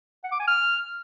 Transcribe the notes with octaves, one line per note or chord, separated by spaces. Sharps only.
F#5
D6
G#5
F6